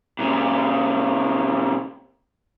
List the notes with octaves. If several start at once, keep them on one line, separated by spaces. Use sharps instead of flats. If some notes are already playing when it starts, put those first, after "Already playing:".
A#2 C#3